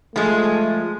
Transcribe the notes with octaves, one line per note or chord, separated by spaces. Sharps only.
F3 G#3 A3